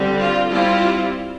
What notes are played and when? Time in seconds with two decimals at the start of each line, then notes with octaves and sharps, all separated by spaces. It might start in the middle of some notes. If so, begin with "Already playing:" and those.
Already playing: D3 G3 C4
0.18 F4
0.51 G3 C4 E4 F4